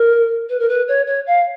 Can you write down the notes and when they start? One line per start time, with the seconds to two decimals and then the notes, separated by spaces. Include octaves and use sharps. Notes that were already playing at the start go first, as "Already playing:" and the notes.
Already playing: A#4
0.49 B4
0.60 A#4
0.69 B4
0.88 C#5
1.07 C#5
1.27 F5